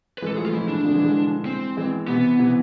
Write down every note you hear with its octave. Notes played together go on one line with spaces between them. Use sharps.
B4
E3 G#3 A4
F3 A3 G#4
F4
E3 G#3 E4
D4
D3 F3
E3 G#3
E3 G#3
C4
E3 G#3
C3 E3 B3
C3 E3